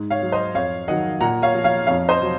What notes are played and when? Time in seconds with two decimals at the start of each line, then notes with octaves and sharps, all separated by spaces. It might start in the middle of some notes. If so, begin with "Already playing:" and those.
Already playing: G#2
0.10 C#5 F5
0.22 F#3
0.32 C5 D#5
0.54 F2 C#5 F5
0.88 D#3 F#3 D#5 F#5
1.21 A#2 F#5 A#5
1.42 C#5 F5
1.54 F3
1.64 C#5 F5
1.87 F2 C#5 F5
2.08 C5 D#5
2.20 C3 F#3